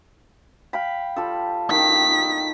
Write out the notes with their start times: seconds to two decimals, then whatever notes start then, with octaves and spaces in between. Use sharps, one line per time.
0.73 F5 G5 B5
1.16 G3 F4 A4
1.71 D#3 D#4 B6